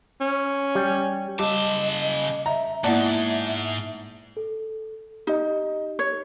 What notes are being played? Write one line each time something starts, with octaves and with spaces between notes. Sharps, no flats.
C#4
G3
C#3 G3 G4 D#5 A5 D6
D#5 E5 A#5
G#2 A#3 B3 E4 D5 E5 F#5 A5
A4
D#4 G4 D#5
C#5